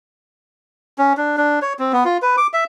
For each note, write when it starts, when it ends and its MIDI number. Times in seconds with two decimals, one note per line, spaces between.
0.98 1.13 61
1.17 1.37 62
1.37 1.59 62
1.62 1.73 73
1.79 1.92 60
1.93 2.04 59
2.05 2.18 65
2.22 2.36 71
2.37 2.47 86
2.53 2.64 76